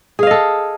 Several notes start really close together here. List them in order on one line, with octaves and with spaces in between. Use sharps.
G#4 F5 D#5 A4